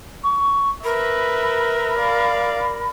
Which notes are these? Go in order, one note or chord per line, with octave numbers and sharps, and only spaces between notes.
C#6
A#4 B4 E5 B5
D5 F5